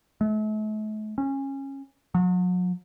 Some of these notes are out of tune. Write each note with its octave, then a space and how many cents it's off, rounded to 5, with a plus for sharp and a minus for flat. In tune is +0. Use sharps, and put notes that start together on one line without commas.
A3 -40
C#4 -20
F#3 -40